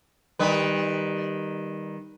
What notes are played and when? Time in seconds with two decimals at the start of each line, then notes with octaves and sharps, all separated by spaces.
0.39 D#3 G3 B4